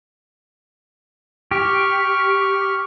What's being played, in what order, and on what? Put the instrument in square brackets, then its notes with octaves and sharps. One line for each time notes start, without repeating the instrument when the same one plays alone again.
[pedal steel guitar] G4 [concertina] C#6 F6